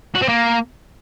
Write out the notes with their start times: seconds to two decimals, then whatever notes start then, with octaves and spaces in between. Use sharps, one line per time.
0.15 F#4
0.22 C4
0.29 A#3